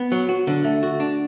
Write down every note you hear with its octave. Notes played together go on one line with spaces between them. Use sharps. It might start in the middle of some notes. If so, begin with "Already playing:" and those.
Already playing: B3
F#3
F#4
D3
A3
F#4
D4